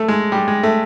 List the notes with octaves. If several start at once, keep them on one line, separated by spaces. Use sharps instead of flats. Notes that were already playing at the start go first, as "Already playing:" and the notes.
Already playing: A3
G#3
G3
G#3
A3